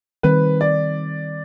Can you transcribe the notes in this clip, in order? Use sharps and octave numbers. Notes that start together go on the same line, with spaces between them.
D#3 G3 C4 B4
D5